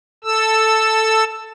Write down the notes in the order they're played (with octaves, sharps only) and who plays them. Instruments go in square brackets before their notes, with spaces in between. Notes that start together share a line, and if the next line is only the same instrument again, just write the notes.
[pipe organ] A4 E6